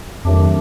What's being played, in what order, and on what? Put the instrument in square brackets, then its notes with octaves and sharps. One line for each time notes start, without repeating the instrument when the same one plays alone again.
[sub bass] F2 [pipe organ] D#3 F#3 A3 D4 G4